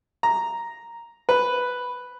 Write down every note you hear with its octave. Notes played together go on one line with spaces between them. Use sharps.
A#5
B4